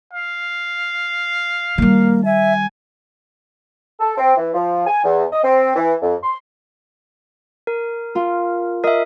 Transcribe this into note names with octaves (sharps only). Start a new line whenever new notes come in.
F5
D#3 G3 A#3
E5 G#5
A4
C4
E3
F3
G#5
E2
D#5
C4
E3
F2
C6
A#4
F4
A#4 D#5 E5